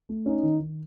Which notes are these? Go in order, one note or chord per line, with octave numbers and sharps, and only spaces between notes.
A3
C#4 D#4
D#3
D#3